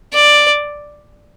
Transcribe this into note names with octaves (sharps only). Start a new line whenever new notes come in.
D5